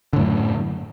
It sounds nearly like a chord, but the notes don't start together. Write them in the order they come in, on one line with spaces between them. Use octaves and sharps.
D3 A2 F#2